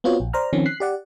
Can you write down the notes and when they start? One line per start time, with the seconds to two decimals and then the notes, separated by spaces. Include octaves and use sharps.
0.04 B3 C4 F4 F#4 C#5
0.20 A#1
0.33 C5 D5 A#5 F6
0.53 D#3 F3 C4 C#4
0.66 F#6 B6 C7
0.80 G4 D5 F#5